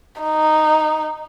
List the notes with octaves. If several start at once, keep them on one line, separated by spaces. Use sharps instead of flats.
D#4